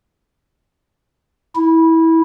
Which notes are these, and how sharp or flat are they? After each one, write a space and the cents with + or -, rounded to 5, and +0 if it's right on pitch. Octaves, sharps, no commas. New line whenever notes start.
E4 -20